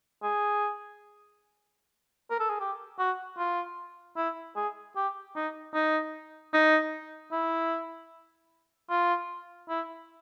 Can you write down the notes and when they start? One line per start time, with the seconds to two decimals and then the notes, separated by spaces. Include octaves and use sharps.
0.23 G#4
2.30 A#4
2.40 A4
2.50 G#4
2.60 G4
2.99 F#4
3.38 F4
4.17 E4
4.56 G#4
4.96 G4
5.36 D#4
5.74 D#4
6.53 D#4
7.32 E4
8.90 F4
9.69 E4